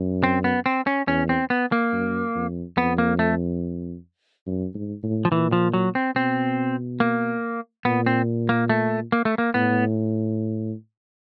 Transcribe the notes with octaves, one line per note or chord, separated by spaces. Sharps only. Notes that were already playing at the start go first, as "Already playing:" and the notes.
Already playing: F#2
C4
B3
C4
C#4
E2 C#4
C4
B3
A#3
F#2
F2
F2 B3
A#3
A3
F#2
G#2
A2
F3
A#2 E3
F3
F#3
C4
B2 C4
A#3
A#2 B3
C4
A#3
A3
A#3
A3
A#3
A2 B3